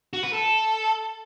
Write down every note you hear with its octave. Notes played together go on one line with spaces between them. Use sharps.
F#4
B4
A4